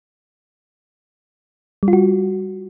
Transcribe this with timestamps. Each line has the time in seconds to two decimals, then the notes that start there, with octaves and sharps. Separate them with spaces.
1.83 G3
1.88 F4
1.93 F#4